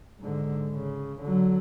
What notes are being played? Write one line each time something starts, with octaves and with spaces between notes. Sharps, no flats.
G#2 D3
C#3
D3 F#3